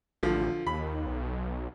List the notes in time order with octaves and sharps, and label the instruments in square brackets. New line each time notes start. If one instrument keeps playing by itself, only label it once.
[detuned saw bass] A1 [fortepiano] D3 F3
[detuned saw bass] D#2 [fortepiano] B5
[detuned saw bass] B1